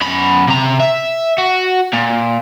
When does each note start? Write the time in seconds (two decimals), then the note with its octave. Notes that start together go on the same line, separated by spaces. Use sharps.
0.02 F#2 B5
0.48 C3 A#5
0.80 E5
1.38 F#4
1.93 A#2